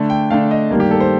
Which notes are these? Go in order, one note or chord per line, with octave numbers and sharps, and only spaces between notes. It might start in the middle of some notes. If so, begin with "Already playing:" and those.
Already playing: D3 A3 D4
G5
D3 A3 D4 F5
D#5
G2 D#3 G3 A#3
G4
A4
C5